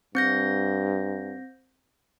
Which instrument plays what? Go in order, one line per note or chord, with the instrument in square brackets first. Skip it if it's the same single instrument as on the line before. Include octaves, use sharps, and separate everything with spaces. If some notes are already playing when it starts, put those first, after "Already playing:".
[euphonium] G2 [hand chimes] C4 G6 A#6